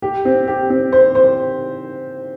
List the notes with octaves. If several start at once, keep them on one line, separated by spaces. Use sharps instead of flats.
G4
C4
G4
C4
C5
C5